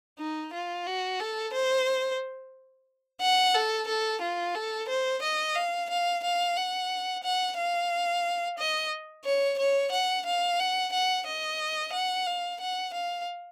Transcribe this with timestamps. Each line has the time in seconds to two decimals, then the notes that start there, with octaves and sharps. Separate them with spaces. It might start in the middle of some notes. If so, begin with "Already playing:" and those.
0.19 D#4
0.53 F4
0.87 F#4
1.20 A4
1.54 C5
3.21 F#5
3.54 A4
3.88 A4
4.22 F4
4.55 A4
4.89 C5
5.22 D#5
5.55 F5
5.90 F5
6.24 F5
6.57 F#5
7.24 F#5
7.57 F5
8.58 D#5
9.25 C#5
9.58 C#5
9.92 F#5
10.26 F5
10.59 F#5
10.92 F#5
11.26 D#5
11.93 F#5
12.27 F5
12.61 F#5
12.94 F5